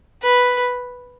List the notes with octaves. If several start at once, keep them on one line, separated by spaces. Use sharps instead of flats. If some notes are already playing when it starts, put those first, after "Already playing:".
B4